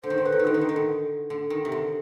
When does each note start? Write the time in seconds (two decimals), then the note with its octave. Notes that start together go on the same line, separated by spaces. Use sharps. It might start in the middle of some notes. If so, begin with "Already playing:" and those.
0.03 D3 C5
0.10 D#3
0.18 D3
0.24 D#3 B4
0.32 D3
0.39 D#3
0.45 D3 D#4
0.54 D#3
0.61 D3
0.69 D#3
0.76 D3
1.30 D3
1.50 D#3
1.65 C3
1.72 D3